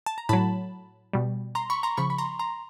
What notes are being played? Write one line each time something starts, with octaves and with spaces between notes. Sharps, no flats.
A5
A#5
A2 F#3 A5 B5
B2 G3
A#5 C6
B5 C#6
A#5 C6
C#3 F3 B5 C#6
B5
A#5 C6
A#5 C6